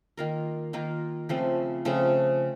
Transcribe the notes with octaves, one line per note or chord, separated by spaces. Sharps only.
D#3 A#3 F4 A#4
D#3 A#3 F4 A#4
C#3 F3 A3 C4
C#3 F3 A3 C4